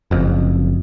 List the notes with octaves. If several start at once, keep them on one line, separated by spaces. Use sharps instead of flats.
F#1 F2